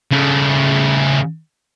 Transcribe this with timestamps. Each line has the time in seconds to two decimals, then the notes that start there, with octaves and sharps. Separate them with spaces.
0.11 C#3 A3